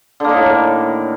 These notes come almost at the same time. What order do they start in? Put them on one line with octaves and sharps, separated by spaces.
D3 A#3 D#3 A2